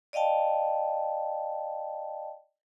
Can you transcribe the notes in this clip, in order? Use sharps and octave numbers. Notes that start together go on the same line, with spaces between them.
D5 D#5 F5 G5 A5